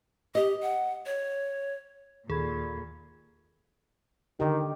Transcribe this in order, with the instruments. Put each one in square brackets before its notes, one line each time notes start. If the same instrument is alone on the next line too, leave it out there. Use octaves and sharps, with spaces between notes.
[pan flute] G4 [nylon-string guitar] D#5
[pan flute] F#5
C#5
[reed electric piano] D#2 [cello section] A#2 [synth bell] G#4 [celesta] A4 B5 G#6
[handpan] D3 G4 [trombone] D#3